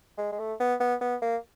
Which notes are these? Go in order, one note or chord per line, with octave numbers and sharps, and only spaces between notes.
G#3
G#3
A3
B3
B3
B3
A#3